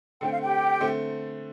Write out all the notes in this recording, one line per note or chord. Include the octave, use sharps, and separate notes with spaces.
D3 A3 C4 G5
F5
G4 G5
D3 A3 C4